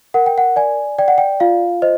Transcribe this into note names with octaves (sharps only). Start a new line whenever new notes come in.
A#4 F#5
G5
F#5
D5 G#5
D5 G5
F#5
G5
F4 F5
C5 D#5